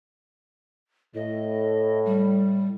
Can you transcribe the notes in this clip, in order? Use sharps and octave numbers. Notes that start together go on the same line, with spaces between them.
A2 D#5
G3